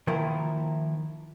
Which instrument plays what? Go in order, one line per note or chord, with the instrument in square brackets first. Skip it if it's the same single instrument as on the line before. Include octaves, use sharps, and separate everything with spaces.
[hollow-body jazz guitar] D#3 F3 A#3 E4 A#4